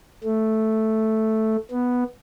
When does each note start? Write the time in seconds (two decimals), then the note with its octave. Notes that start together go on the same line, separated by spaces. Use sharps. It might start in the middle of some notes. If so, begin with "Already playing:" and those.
0.24 A3
1.71 B3